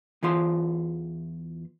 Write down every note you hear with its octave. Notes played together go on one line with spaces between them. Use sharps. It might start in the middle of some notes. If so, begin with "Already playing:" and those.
E2 E3 F4 C6